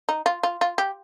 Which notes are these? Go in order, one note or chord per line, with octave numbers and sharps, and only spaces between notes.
D#4
F4
F4
F4
G4